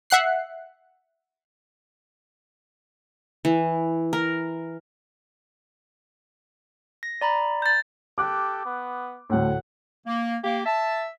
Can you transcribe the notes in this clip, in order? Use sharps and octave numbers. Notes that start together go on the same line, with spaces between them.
E5 F#5 F#6 C7
E3
A#4
A#6
D5 A#5 B5
G6 A6
G4 A4 D6 F#6
B3
D2 A2 F#5
A#3
A#3 G4
E5 A5